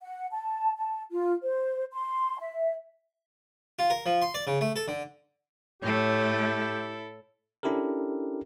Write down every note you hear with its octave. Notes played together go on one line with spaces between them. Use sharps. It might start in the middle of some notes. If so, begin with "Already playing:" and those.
F#5
A5
A5
F4
C5
C6
E5
F4
A#4
F3
C6
D5
C#3
A3
A4
D3
A2 A3 E4 G4 A4 C#5
C#4 D4 E4 G4 A4 A#4